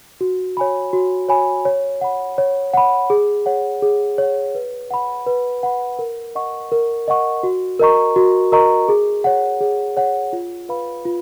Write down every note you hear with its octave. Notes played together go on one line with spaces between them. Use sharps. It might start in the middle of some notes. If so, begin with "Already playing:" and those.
F#4
C#5 G#5 B5
F#4
C#5 G#5 B5
C#5
F#5 B5
C#5
F#5 B5
G#4
C#5 F#5
G#4
C#5 F#5
B4
F#5 B5
B4
F#5 B5
A#4
D#5 F#5 C#6
A#4
D#5 F#5 C#6
F#4
A#4 D#5 A#5 C#6
F#4
A#4 D#5 A#5 C#6
G#4
C#5 F#5
G#4
C#5 F#5
F4
B4 F5 B5
F4